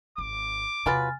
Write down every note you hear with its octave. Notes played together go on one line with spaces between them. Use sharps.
G#1 D6
E2 C3 F#3 F4 B4 G#5 F6 A6